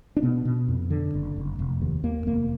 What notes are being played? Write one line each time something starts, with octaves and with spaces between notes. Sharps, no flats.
D4
B2 B3
B2
F2
D3
F#1
F#1
F1
D#2
D#2 A#3
F1 A#3